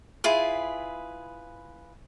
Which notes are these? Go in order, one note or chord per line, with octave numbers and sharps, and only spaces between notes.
E4 F4 G#4 B4